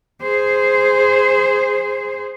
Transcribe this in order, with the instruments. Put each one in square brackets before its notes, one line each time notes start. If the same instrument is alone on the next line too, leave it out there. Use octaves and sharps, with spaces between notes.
[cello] G#4 C5